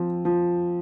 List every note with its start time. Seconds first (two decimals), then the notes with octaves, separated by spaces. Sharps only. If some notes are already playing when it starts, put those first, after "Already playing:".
Already playing: F3 C4
0.25 F3